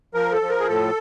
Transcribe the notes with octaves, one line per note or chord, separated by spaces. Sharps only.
F3 A#4
A4
F3
A#4
G#4
A2 A4